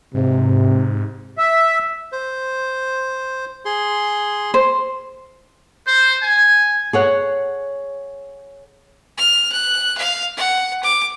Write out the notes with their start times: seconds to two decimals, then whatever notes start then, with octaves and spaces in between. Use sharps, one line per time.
0.15 G#2 C3
1.38 E5
2.12 C5
3.65 G#4 C6
4.54 C5
5.86 C5
6.23 G#5
6.93 G#4 C#5 F#5
9.18 F6
9.52 F#6
9.98 F5
10.37 F#5
10.83 D6